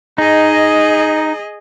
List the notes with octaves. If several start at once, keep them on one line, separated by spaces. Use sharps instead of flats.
D#4 G#4 D#5